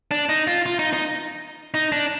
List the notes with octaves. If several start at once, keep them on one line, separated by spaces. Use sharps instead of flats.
D4
D#4
F4
F4
D#4
D#4
D#4
D4